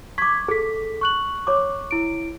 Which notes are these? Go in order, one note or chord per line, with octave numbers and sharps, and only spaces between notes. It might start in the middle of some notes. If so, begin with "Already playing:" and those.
C#6 D6 G#6 B6
G#4 A4 B6
C#6 F#6 F#7
C#5 C6 D6
E4 D7